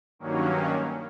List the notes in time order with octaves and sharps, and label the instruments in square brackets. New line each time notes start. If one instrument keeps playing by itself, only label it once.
[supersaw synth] G2 D#3 F#3 A#3 C#4